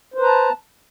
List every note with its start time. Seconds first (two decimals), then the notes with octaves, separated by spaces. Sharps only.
0.14 C5
0.18 B4
0.23 A#5
0.27 A5